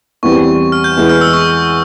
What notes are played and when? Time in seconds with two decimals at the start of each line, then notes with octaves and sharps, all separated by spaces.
0.23 E2 E3 G3 C4 C#6
0.72 F6
0.84 G6
0.97 E2 E3 G#3 E4
1.09 F6
1.21 E6
1.33 C#6